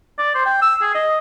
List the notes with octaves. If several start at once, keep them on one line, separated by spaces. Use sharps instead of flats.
D5
C5
G5
E6
G#4
D#5